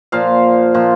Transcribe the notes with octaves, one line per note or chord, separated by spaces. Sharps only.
A#2 F3 F5
A#2 F3